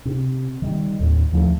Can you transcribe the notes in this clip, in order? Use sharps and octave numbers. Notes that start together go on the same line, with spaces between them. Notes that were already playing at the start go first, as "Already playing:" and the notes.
C3
D#3 G3
D#2 A2
D#2 F3 G#3 A3